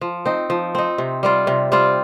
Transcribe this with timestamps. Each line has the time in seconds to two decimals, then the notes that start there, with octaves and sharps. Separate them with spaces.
0.01 F3
0.26 C4 D#4
0.50 F3
0.75 C4 D#4
0.98 C3
1.23 G3 C4 F4
1.47 C3
1.72 G3 C4 F4